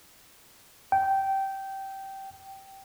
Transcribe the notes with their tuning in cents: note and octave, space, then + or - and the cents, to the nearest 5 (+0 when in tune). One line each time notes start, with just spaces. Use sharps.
G5 -15